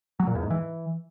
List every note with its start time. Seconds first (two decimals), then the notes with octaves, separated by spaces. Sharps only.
0.20 F#3
0.27 A#2
0.35 E2
0.43 G#2
0.50 E3